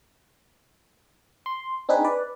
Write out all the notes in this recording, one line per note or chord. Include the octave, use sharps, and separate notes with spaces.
C6
C4 D4 D#4 G#4 B4
B4 D5